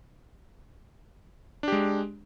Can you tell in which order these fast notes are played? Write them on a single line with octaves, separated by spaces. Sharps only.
D4 G4 G#3